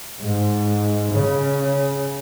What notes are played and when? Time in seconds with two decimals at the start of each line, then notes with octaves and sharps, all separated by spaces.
0.21 G#2
1.13 C#3